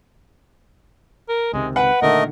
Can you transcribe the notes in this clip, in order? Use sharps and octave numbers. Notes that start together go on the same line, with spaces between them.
A#4
C#2 C3 D#3 G#3
B4 F#5
A#2 D3 D#3 A3 A#4 D#5